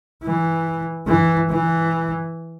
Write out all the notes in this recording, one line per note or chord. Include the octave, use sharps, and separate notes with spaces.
E3
E3
E3